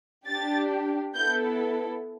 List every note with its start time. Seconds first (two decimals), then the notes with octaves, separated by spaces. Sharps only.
0.26 D4 G4 A6
1.15 B3 E4 A4 G6